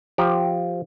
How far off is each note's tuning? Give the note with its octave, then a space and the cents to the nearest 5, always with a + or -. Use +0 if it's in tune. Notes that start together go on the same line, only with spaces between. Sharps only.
F3 +0 G4 +0 A#5 +30